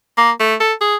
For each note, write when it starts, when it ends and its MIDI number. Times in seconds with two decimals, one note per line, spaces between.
0.17 0.31 58
0.40 0.55 57
0.60 0.73 69
0.81 0.96 68